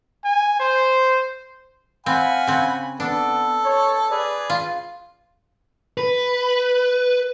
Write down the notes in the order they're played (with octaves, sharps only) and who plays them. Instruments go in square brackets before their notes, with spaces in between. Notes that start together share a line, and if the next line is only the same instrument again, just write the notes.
[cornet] G#5
C5
[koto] C4 [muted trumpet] F5 [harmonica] F#5 G#5 B5
[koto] C#3 C4
[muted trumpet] B3 [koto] D4 [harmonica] A4
[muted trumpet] C#5
[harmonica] G#4 B4 [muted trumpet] D5
[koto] F4
[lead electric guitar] B4